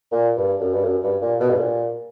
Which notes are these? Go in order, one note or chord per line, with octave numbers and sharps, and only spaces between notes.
A#2
G2
F#2
G2
F#2
G2
A#2
B2
G2
A#2